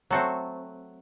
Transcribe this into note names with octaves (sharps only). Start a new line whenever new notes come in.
F#3 A3 C4 F#4 A4